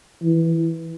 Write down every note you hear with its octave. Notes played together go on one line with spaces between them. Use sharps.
E3